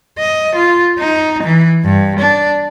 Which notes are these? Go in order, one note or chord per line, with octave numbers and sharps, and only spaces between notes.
D#5
F4
D#4
E3
G2
D4